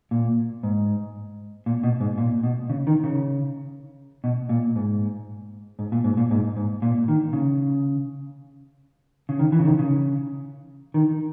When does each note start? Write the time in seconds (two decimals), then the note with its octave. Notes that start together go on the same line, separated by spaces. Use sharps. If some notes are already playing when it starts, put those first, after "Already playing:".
0.11 A#2
0.63 G#2
1.66 A#2
1.83 B2
2.00 G#2
2.18 A#2
2.43 B2
2.70 C#3
2.87 D#3
3.04 C#3
4.24 B2
4.49 A#2
4.76 G#2
5.79 G#2
5.92 A#2
6.04 G#2
6.17 A#2
6.31 G#2
6.56 G#2
6.82 A#2
7.08 D#3
7.33 C#3
9.29 C#3
9.39 D#3
9.52 E3
9.59 C#3
9.65 D#3
9.79 C#3
10.94 D#3